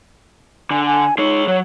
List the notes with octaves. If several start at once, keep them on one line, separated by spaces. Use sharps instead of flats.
D3 G#5
G#5
G#3 D#4 C#5
F#3 C#5